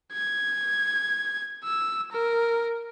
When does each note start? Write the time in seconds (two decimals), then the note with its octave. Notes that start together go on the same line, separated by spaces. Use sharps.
0.13 G#6
1.64 E6
2.12 A#4